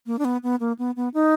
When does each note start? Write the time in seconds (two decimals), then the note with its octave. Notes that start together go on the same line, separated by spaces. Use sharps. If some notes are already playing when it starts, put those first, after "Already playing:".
0.06 A#3
0.19 D4
0.25 B3
0.43 B3
0.60 A#3
0.79 B3
0.96 B3
1.14 D#4